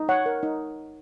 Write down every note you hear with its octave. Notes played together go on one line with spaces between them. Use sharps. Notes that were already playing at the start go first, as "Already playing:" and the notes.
Already playing: D#4
C#5 F#5
A#4
D#4